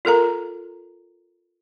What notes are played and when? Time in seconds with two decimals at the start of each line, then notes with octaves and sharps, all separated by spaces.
0.05 F4 A4 A#4 A#5